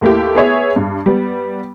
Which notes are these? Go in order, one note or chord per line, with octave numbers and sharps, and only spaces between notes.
D#2 A3 A#3 E4 G4
B3 G#4 C#5 E5
G2
G3 B3